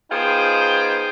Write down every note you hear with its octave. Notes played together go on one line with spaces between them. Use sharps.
B3 D#4 F4 G#4 C5 G5